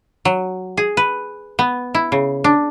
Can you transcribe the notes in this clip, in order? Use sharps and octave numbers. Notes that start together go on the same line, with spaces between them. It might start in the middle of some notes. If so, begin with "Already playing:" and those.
F#3
G#4
B4
B3
E4
C#3
D4